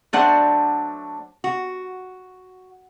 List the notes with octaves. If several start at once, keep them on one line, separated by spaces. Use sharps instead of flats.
F#3 A3 D4 C5 D5 F#5
F#4